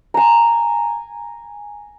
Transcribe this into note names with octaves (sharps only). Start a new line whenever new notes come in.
G#5 A#5